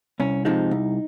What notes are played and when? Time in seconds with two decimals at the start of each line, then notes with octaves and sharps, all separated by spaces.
0.20 C2 C#4
0.45 C3 F3 G#3 D#4
0.71 C2